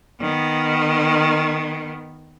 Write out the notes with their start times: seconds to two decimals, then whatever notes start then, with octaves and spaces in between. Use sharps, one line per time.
0.20 D#3 B3